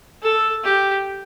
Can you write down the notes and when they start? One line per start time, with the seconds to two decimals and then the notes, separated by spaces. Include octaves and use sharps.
0.23 A4
0.64 G4